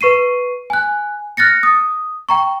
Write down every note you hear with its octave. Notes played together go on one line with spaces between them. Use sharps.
B4 C#6 C7 D#7
G#5 F#6
F6 F#6 A6 A#6 C#7
D#6
G5 A#5 C#6